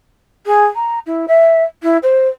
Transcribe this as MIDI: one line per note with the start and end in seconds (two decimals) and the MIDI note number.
0.46 0.65 68
0.75 0.99 82
1.06 1.26 64
1.28 1.62 76
1.82 1.97 64
2.02 2.28 72